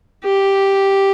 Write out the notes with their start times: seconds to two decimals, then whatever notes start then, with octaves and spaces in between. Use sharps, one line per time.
0.25 G4